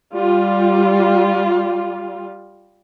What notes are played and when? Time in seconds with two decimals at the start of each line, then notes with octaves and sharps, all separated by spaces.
0.12 G3 F4